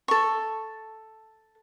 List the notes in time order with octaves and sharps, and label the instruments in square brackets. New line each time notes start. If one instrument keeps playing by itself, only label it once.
[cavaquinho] A4 C#6